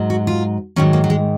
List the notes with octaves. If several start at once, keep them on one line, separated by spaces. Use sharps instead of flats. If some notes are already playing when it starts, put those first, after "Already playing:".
Already playing: G#2 F#3
F#4
F4
G#2 D#3 F#3 C#4
A#3
F#3
G#3